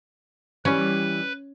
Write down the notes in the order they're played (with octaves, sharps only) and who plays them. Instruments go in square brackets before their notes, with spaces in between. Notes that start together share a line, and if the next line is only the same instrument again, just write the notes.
[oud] E3 G3 [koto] C#4 [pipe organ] B4